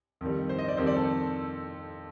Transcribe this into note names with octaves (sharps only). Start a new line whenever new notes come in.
F2 D#3 G3
C5
D#5
D5
F2 D#3 G3 C5
D5
A4